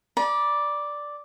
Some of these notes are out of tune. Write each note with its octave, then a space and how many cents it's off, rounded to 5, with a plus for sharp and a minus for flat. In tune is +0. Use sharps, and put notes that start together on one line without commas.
D5 +0 B5 -45